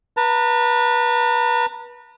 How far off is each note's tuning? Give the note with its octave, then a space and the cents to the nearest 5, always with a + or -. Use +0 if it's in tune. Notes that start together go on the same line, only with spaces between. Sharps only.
B4 -25 A#5 -45